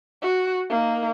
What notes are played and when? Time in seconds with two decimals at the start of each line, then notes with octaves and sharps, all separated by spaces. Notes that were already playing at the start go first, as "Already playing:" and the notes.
0.22 F#4
0.69 A#3 D#4